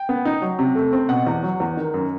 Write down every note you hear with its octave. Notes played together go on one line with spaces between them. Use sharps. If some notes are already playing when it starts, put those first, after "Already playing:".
Already playing: G5
B3
D#4
F#3
C3
A3
C4
B2 F#5
E2
F#3
E2
D#3
F#2